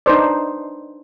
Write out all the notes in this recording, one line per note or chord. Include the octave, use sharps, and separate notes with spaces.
D4 D#4 B4 C5 D5